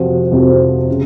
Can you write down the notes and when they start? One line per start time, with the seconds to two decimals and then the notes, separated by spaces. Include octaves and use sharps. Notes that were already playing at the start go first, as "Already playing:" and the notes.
Already playing: F2 C3 F3 C4 F#4
0.31 F2 C3 F3 C4 F#4
0.90 C#3